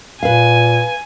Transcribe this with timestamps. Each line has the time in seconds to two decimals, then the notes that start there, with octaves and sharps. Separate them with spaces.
0.23 A#2 B4 F5 G#5